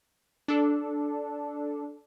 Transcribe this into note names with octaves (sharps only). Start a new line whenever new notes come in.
D4 A4